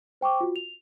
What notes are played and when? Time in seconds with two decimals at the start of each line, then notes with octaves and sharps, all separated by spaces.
0.21 C5 G5 C#6 D6
0.41 F4 F#4
0.56 F7